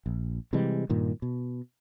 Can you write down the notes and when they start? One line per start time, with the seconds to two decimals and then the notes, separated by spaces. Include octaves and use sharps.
0.06 A#1
0.53 C3 E3 G3 G#3
0.90 G2 A#2 D#3
1.22 B2